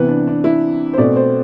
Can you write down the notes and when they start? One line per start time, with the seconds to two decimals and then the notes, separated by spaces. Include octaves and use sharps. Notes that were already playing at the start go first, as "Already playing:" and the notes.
Already playing: C3 E3 B3 B4
0.09 D4
0.27 D4
0.44 E4
0.93 C5
0.98 B2 A3 C4 D5
1.16 C5